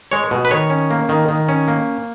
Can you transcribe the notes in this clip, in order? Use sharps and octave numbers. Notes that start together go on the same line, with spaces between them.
G#3 C#5
B2
B4
D#3 C#5
C#4
A#3
D#3
D#3
C#4
A#3